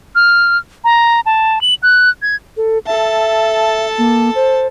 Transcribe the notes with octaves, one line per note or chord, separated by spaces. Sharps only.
F6
A#5
A5
F#7
F#6
G#6
A4
A4 E5 A5
A#3
C5